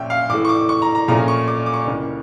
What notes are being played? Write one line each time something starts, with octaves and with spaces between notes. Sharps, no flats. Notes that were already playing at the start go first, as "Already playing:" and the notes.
Already playing: A#2 F3 C#4 E5 G5
F5
A2 E3 A3 D6
C#6
D6
C#6
A#5
A#5
A#2 F3 A3 C#4 A#5
C#6
D6
D6
C#6
C#2 C#3 E3 A#3